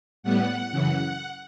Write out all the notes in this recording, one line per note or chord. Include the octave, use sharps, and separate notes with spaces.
A2 G3 B3 F#5
F#2 C#3 E3